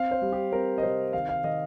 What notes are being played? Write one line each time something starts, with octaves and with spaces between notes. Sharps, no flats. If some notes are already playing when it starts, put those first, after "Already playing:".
Already playing: C4 F5
C5
G3
G4
C4 A#4
D#5
C3 C5
D#3 F5
F5
D#3 D#5